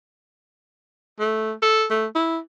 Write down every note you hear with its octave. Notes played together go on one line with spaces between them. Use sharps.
A3
A4
A3
E4